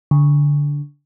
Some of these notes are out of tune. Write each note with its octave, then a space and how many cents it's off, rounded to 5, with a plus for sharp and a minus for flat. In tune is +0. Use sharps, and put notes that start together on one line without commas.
D3 -15